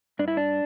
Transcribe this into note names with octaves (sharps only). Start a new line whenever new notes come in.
G2 D4
E4
D4